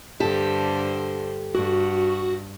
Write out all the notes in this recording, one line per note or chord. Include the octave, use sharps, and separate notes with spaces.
G2 D3 G4 A4 C5
G2 F#4